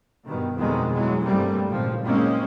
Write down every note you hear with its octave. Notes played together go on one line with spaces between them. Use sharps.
G2 B2 D#3
G1 F2 B2 D3 D#3 G#3
E3 F#3 G#3
G2 C3 G3 A3 A#3 C4
G#1 C#2 A#2 F3
F#1 A#2 G#3 A#3 C4 C#4